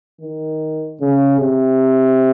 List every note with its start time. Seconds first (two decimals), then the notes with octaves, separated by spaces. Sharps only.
0.21 D#3
1.00 C#3
1.40 C3